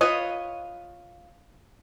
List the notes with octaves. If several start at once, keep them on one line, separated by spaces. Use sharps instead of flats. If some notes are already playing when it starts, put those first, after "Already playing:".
F4 B4 C#5 D#5